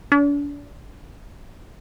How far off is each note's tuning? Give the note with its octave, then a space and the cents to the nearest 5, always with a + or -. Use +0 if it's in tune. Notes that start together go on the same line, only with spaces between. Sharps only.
D4 -35